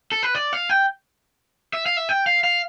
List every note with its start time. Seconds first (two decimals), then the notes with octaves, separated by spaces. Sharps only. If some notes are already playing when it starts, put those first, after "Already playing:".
0.12 A4
0.23 B4
0.35 D5
0.53 F5
0.69 G5
1.73 E5
1.86 F5
1.97 E5
2.09 G5
2.27 F5
2.44 F5